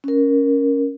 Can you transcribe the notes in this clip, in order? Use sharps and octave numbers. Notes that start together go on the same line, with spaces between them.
C#4 A#4